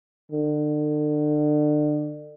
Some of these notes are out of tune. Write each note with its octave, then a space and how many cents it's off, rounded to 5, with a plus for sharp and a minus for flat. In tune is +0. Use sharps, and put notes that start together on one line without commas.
D3 +35